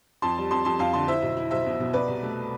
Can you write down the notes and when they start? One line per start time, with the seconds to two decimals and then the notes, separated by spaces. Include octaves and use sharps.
0.22 F2 A5 C6
0.38 G3
0.51 F2 A5 C6
0.65 F2 A5 C6
0.79 F2 F5 A5
0.93 D3 A5 C6
1.08 E4 C5 E5
1.23 B1
1.37 E4
1.51 B1 C5 E5
1.66 B2
1.80 B2
1.93 B2 B4 D5
2.08 C2
2.23 A3